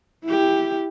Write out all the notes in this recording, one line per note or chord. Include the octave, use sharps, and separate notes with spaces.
E4 G4